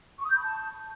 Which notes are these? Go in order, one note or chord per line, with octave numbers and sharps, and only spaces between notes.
C#6
D#6
G6
B5
A5